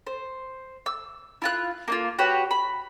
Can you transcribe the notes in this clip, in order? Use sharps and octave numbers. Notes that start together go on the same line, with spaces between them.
C5
E6
E4 F4 F#6
A#3 D#4 F4
F#4 G4 B4 C#5
B5